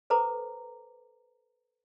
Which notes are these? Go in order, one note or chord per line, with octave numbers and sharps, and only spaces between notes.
A4 B4 C5 A#5 D6